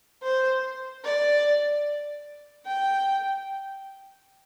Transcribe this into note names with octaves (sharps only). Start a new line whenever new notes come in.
C5
D5
G5